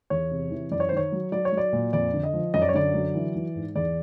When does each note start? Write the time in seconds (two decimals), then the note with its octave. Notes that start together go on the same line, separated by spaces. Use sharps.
0.10 E2 C#5
0.31 C3
0.51 E3
0.71 F#2 D5
0.80 C#5
0.89 D#3 C5
0.97 C#5
1.12 F#3
1.32 F#3 D5
1.45 C#5
1.52 F#3
1.57 D5
1.73 A#2
1.93 F2 D5
2.13 D3
2.23 D#5
2.34 F3
2.54 F#2 D#5
2.62 D5
2.69 C#5
2.74 D3 D5
2.94 F#3
3.15 E3
3.35 E3
3.55 G#2
3.75 E2 D5